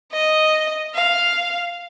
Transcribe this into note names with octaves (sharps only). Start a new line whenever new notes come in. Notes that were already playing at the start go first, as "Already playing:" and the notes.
D#5
F5